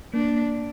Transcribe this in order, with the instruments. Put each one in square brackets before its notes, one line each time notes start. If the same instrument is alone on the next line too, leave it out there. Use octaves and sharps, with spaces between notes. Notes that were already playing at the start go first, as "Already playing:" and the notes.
[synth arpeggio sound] A#3 [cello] D4